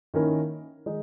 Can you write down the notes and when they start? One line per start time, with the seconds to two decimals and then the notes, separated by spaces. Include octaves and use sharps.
0.14 D#3 A#3 C#4 E4 A#4
0.86 D#3 G#3 D#4